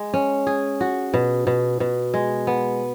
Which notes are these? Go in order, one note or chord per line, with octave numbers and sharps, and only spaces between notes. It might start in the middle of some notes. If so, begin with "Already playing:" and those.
Already playing: G#3
C#4
G#4
F#4
B2
B2
B2
G#3
B3